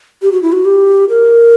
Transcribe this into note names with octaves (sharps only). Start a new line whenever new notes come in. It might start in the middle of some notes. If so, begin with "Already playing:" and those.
G4
F#4
E4
F#4
G4
A#4